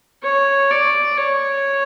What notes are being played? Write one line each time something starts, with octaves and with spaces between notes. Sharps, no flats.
C#5
D5
C#5